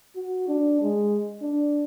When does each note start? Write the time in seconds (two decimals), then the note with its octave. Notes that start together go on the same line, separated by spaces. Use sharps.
0.16 F#4
0.48 D4
0.82 G#3
1.42 D4